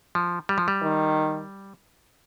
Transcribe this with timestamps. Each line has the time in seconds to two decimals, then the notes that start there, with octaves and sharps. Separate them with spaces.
0.15 F3
0.49 G3
0.58 F3
0.68 G3
0.82 D#3